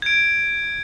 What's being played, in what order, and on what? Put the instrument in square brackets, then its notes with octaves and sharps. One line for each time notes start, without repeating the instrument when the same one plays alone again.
[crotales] G#6 D7